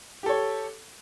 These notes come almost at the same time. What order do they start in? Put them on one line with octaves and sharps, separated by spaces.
G4 A4 C#5